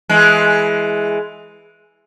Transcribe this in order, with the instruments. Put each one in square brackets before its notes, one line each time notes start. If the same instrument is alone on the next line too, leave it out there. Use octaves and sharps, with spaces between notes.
[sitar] E3 G#3